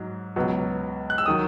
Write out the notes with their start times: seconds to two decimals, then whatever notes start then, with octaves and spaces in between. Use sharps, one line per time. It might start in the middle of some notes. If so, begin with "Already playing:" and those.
Already playing: G#2 F#3
0.36 C#2 B2 F#3
1.10 F#6
1.18 E6
1.26 D#3 F#3 D#6